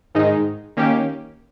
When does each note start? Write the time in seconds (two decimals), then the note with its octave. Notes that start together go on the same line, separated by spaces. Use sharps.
0.15 G#2 D#3 G#3 D#4
0.77 D#3 A#3 C#4 G4